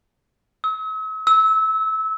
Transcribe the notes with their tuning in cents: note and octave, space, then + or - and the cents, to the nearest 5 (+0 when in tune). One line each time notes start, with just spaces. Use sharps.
E6 -45
E6 -25